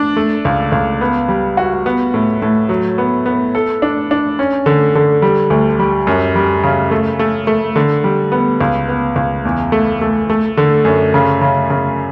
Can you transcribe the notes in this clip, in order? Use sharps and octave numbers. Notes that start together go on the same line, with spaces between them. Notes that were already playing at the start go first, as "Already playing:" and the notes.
Already playing: D4
A3
C#2
C#2
B3
G3
F#4
B3
A2
A2
F#3
B3
B3
A4
D4
D4
C#4
D3
D3
G3
D2
G3
F#2
G3
C#3
A3
A3
A3
D3
G3
B3
C#2
B3
C#2
E2
A3
A3
A3
D3
F#2
C#3
C#3
C#3